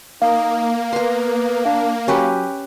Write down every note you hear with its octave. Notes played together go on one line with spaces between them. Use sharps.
A#3 D#4 F5
B3 A#5 C6
D4 F5
F#3 C#4 G4 B4